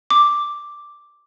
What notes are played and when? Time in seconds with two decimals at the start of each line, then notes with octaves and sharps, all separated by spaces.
0.10 D6